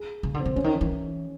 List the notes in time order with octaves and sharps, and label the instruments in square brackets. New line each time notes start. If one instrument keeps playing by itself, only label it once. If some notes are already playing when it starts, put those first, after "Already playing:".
Already playing: [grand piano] G#4
[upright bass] C#3
D3
[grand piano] C4 C5
[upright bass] D3
[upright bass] D3 [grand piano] C#4 C#5
[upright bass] D#3
E3